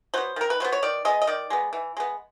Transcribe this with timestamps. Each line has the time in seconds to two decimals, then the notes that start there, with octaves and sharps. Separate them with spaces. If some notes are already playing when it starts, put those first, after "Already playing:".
0.14 F#3 B3 C5
0.36 D#3 A#4
0.50 B4
0.60 F#3 B3 C5
0.72 C#5
0.83 D#3 D5
1.05 G#3 B3 D#5
1.22 D#5
1.27 D#3 D5
1.50 G#3 B3
1.73 E3
1.97 G#3 B3